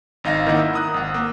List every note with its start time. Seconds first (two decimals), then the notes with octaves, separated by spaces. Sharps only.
0.24 G#1 D#4 F5 A#6
0.46 D#3 A#3 D#4 E4 F#5
0.59 E6
0.74 A#5 D#6 F#6
0.94 G#1 F#5
1.14 A#3